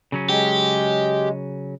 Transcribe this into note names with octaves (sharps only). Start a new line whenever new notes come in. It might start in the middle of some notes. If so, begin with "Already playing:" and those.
C#3 F#3 C#4
G#3 G4